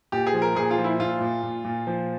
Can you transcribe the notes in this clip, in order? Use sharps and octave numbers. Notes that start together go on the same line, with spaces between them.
A#2 G4
G#4
F3
A#4
A#2 G#4
F4
F3
E4
A#2 F4
A#2
A#2
A#2
F3